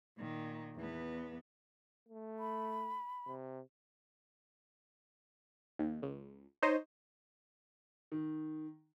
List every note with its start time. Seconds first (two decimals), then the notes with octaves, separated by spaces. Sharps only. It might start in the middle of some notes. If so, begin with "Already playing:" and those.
0.17 A#2 D#3
0.76 E2 B3
2.09 A3
2.39 B5
3.26 C3
5.79 D#2
6.02 C#2
6.62 D#4 C5 C#5 D#5
8.12 D#3